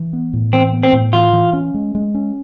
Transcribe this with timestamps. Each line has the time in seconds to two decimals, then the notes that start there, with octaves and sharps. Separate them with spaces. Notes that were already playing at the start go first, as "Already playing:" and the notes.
Already playing: E3
0.13 B3
0.33 A2
0.53 E3 C4
0.73 B3
0.83 C4
0.93 A2
1.13 E3 F4
1.33 E3
1.53 C#4
1.74 G#3
1.95 G#3
2.15 C#4